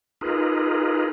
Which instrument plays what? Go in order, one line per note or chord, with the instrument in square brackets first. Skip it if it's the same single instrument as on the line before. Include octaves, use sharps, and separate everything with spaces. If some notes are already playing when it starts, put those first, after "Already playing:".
[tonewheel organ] D#4 F4 G#4 A#4 B4